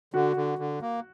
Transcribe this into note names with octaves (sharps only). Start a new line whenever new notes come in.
D3 F#4
D3
D3
A#3